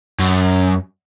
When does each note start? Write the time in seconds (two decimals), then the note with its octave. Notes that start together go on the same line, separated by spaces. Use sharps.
0.19 F#2